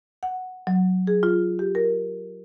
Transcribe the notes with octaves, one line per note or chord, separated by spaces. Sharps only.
F#5
F#3
G#4
F4
G4
A#4